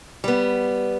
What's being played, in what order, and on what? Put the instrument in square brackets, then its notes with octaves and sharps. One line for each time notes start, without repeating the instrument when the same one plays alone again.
[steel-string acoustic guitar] G3 B3